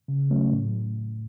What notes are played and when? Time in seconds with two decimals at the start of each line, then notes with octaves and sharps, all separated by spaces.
0.08 C#3
0.30 F#3 A3 C#4
0.52 A2